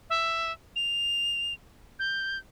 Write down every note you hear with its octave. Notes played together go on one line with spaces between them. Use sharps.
E5
F7
G6